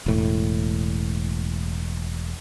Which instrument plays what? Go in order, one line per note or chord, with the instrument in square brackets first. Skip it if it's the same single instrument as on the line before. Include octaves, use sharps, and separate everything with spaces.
[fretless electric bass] E1 A2